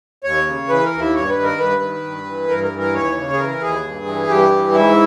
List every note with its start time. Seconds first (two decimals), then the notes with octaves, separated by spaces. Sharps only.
0.24 D#2 C#5
0.46 C#3
0.68 E3 B4
0.85 A#4
0.92 D#2
0.99 E4
1.14 G2 C#5
1.30 B4
1.36 D#3
1.43 A#4
1.58 G2 B4
1.82 D#3
2.04 G2
2.26 E3
2.49 G2 A#4
2.63 A#4
2.72 E3
2.78 A#4
2.94 D#2 C#5
3.16 C#3
3.33 G#4
3.39 E3 A#4
3.61 D#2 G#4
3.84 G2
4.06 E3
4.28 G2 G4
4.51 E3
4.74 G#2 E4